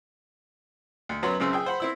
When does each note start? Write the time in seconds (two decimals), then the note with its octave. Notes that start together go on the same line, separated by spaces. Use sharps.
1.09 D2
1.23 F#2 F#3 B3 C#5 F#5 C6
1.40 C#2 F#2 C#3 C4 E6
1.53 G#4 G5 E6
1.66 C5 F#5 B5
1.80 C4 E4 E6